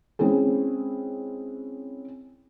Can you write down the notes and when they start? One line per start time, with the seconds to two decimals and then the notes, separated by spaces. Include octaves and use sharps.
0.19 G#3 C4 C#4 E4 G#4